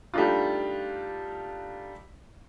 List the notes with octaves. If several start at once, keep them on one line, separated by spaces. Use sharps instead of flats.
G3 A3 D4 D#4 F4